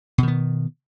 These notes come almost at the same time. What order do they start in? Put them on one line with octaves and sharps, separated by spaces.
B2 D#3 B3